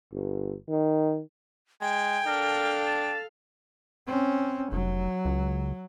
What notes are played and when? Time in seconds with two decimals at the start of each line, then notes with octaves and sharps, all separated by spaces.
0.12 G1
0.69 D#3
1.81 G#3 G5 G#5
2.26 D4 A4 A#4 F5
2.86 A5
4.07 C4 C#4
4.72 F1 F#3
5.25 C#2